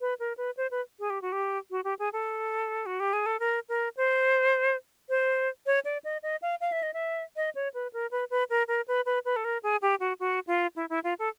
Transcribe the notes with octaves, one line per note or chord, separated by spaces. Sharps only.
B4
A#4
B4
C5
B4
G#4
G4
F#4
G4
F#4
G4
G#4
A4
F#4
G4
G#4
A4
A#4
A#4
C5
C5
C#5
D5
D#5
D#5
F5
F5
E5
D#5
E5
D#5
C#5
B4
A#4
B4
B4
A#4
A#4
B4
B4
B4
A4
A#4
G#4
G4
F#4
F#4
F4
E4
E4
F4
A4